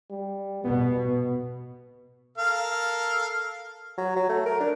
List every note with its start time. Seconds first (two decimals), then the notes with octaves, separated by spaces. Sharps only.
0.11 G3
0.64 B2 B3
2.38 A4 A#4 F5
3.98 F#3
4.16 F#3
4.29 A3
4.46 A#4
4.60 D4